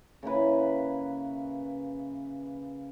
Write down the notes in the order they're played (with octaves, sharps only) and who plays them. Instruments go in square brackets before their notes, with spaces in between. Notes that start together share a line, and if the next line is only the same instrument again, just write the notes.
[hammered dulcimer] C#3 A#3 E4 B4